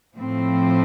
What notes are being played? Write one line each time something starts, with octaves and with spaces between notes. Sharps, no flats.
A2 F3 C4